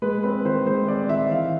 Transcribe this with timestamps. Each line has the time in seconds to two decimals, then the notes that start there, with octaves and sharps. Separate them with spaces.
0.02 G#3 B4
0.23 C4 B4
0.45 D#3 C5
0.66 G#3 C5
0.88 C4 D5
1.09 D#3 E5
1.31 E3 F5